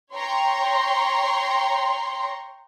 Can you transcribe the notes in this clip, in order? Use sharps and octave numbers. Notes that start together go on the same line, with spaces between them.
C#5 G5 A#5 C6 C#6